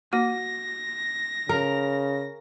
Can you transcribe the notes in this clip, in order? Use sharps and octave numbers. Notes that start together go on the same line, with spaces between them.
A#3 F#4 A#6
C#3 A#4